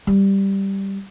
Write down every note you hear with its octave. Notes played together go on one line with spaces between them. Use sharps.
G3